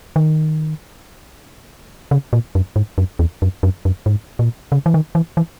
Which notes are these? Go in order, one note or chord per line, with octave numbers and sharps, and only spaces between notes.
D#3
C#3
A#2
F#2
G#2
F#2
E2
F#2
F#2
F#2
G#2
A#2
C#3
E3
D#3
E3
E3